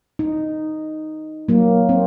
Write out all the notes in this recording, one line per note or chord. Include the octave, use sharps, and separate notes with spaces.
D#4
F#3 A#3
C4